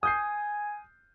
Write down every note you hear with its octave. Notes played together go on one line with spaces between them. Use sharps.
G#5 D#6 G6 C7